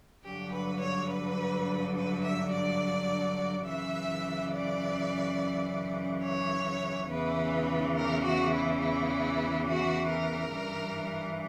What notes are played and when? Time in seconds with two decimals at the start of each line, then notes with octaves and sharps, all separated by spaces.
0.24 G2 D3 F#3 G4
0.52 B4
0.81 C#5
1.10 B4
1.95 B4
2.23 E5
2.52 D5
3.66 F#2 C#3 E3 E5
4.52 D5
6.23 C#5
7.09 E2 C#3 E3 B4
7.95 A#4
8.23 F#4
8.53 E4
8.80 E4
9.66 F#4
10.09 A#4
10.52 G2 E3